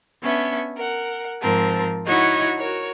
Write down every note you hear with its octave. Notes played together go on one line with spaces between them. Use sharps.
B3 C#4 D4 E5
A#4 F#5
G#2 F3 C4 A#4 A5
D#4 E4 F#4 C#5 D#5 F#5
F#4 A#4 C#5